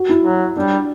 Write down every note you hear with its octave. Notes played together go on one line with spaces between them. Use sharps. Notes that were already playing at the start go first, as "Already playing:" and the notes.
Already playing: F#4
E4
F#3
G3 D4